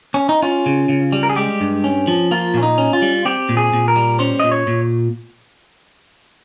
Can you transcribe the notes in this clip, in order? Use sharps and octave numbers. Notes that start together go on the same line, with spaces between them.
C#4
D#4
C#4 F4
C#3
C#3
G3
A#4
G#4
G#3 G4
G2
C#4
F3
A#3 F4
A#2 C#4
D#4
C#4
F4
G3
C4 G4
A#2
G#4
A#2
A#4
G3
C#4 C5
A#2 D#5
C#5
A#2